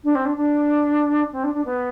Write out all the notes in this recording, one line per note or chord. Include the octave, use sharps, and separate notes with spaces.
D4
C4
D4
D4
C4
D4
D4
B3